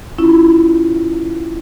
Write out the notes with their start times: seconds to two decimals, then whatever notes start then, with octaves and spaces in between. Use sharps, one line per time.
0.18 C#4 E4 F4